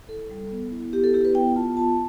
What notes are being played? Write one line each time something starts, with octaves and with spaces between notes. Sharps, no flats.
E4 A4
G3
B3
E4
B3 G4
A4
E4 G4
B4
B3 G5
F4 A5
F4 A5